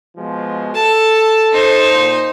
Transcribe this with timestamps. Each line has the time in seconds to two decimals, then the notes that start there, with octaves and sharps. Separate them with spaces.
0.17 B2 F3 G#3
0.75 A4 A5
1.52 D#4 C5
1.90 A#2